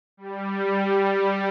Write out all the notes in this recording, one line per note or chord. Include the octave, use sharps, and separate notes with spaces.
G3